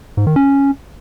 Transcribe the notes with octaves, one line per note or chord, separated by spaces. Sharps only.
G#2
D#3
C#4